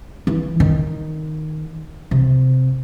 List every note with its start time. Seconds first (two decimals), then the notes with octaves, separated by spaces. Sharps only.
0.27 E3
0.60 D#3
2.11 C3